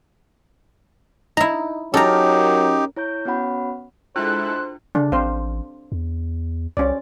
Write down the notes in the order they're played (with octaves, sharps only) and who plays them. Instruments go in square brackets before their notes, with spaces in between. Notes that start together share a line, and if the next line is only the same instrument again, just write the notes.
[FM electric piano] D#4 [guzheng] E4 A#5
[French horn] F#3 [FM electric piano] C#4 A#4 [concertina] D#4 G4 [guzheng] A4 A#5
[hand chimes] E4 C#5 A#5 G6
B3 C#4 F#4 C#5 F#5 B5
[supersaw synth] G#3 E4 A4 [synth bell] D4 F4 [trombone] C5 [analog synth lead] F#6
[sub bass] C#3 [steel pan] D4
[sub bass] A1 [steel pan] C4 C5 F5
[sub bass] E2
[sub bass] C2 [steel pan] C#4 C5 D5